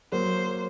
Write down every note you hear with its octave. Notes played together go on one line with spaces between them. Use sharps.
F#3 A#3 C5